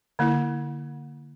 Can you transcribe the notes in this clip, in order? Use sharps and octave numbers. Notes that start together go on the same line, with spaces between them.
D3 A#3 E4